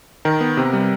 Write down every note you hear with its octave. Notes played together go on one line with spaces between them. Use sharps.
D#3 A#4
B3
C3
G3